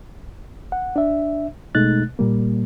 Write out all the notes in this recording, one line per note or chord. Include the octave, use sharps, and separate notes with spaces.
F#5
D4 E5
B2 G#3 A3 D#4 F#6 A6
A#2 G3 A#3